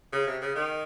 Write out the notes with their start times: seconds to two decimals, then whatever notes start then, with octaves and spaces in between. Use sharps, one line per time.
0.12 C#3
0.26 C3
0.41 C#3
0.55 D#3